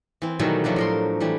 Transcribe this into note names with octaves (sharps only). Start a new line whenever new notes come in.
E3 C4
B2 D#3 E3 F#3 G3 A3
F3 F#3 A3 D4
A2 A#4 C6
E3 G3 A3